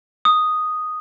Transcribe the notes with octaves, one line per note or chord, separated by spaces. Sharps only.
D#6